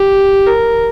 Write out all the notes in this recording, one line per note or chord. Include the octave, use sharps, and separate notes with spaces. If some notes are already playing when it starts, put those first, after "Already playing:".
Already playing: G4
A#4